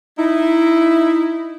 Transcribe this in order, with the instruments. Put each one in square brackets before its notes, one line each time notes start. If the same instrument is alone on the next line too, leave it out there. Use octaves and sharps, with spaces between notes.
[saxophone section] D#4 E4